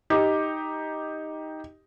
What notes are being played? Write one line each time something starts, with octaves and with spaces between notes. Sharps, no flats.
D#4 G4